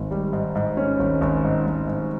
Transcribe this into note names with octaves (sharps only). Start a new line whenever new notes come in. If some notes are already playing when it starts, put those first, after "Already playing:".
Already playing: G#1 G#2
G3
G#2
G#2
C#4
G#1
G#1
G#2
G#1
G#2